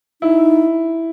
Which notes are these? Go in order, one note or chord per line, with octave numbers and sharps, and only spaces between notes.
D#4 E4